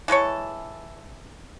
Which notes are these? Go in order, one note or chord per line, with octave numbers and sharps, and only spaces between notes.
E3 G#3 A4 C#5